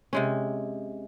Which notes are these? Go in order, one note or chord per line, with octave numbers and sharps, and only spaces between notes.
C3 G#3 C#4